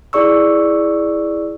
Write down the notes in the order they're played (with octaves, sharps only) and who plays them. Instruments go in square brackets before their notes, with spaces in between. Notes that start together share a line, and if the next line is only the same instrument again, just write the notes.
[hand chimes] E4 G#4 D5 C#6 E6